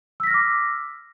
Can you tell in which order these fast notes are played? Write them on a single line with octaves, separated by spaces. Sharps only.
E6 B6 A#6 F6 D6